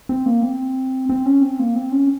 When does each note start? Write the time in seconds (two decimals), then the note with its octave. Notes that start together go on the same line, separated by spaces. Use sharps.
0.09 C4
0.26 A#3
0.43 C4
1.09 C4
1.26 C#4
1.43 C4
1.59 A#3
1.76 C4
1.92 C#4